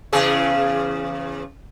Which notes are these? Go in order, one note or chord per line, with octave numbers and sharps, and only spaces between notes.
E2 C#3 G#4